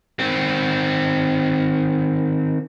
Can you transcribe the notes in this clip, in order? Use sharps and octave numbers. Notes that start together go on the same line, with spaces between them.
D#3 C4